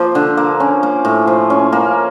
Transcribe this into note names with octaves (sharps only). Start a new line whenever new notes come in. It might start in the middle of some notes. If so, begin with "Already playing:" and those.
Already playing: F3 A#3
D3
A#3
C#4
A#3
A2
F3
C#4
A#3